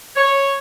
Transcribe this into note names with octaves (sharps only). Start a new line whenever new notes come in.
C#5